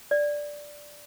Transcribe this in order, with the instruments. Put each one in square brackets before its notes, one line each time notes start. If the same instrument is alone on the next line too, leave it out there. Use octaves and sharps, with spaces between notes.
[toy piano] D5